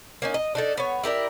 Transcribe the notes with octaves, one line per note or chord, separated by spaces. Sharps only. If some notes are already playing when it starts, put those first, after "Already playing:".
A#3 C#4 D#4
D#5
D4 D#4 A4
B3 C#5
E4 G4 A#4 D5